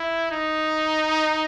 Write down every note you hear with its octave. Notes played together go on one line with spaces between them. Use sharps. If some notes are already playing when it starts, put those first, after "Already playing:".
Already playing: E4
D#4